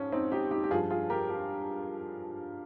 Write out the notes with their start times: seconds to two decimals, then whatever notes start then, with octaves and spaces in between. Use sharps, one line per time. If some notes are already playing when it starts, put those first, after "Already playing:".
Already playing: G#2 F3 C#4
0.12 C4 D#4
0.32 D#4 G4
0.51 D#4 G4
0.64 G4
0.71 G2 F4 G#4
0.75 F3
0.90 F4 G#4
1.10 G4 A#4
1.29 G4